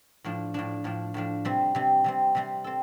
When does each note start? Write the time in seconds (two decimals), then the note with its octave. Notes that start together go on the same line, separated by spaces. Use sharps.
0.24 A2 F3 D4
0.54 A2 F3 D4
0.84 A2 F3 D4
1.14 A2 F3 D4
1.45 C3 G3 C4
1.75 C3 G3 C4
2.04 C3 G3 C4
2.35 C3 G3 C4
2.64 C4 A4